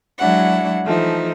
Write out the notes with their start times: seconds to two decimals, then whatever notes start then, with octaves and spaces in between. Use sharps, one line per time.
0.19 F#3 G#3 D4 E4 F#5
0.84 E3 F3 A3 D#4